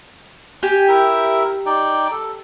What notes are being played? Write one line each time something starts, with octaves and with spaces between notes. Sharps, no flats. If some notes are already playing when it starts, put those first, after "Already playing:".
G4 G#5
E4 A#4 E5
D#4 D5 G5
A4